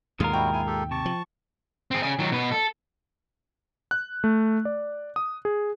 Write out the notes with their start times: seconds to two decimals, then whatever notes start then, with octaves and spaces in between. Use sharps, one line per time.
0.20 D#2 G#2 B2 D3 G#3 F4 A#4 F6
0.33 G3 E4 F#4 G5
0.53 E4 G#5
0.67 G4 A4
0.91 C3 A5 C#6
1.06 F3
1.91 C4 G#4
2.03 C#3 G#5
2.19 D#3 F#3
2.32 B2 B4
2.52 A4
3.91 F#6
4.24 A3
4.65 D5
5.16 D#6
5.45 G#4